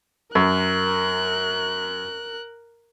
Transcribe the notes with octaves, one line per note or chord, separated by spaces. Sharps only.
F#2 A#4 F#6